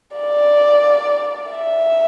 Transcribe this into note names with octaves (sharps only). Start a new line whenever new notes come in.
D5
E5